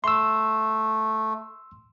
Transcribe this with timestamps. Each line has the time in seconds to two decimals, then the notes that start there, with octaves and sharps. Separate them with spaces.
0.04 A3 C6 E6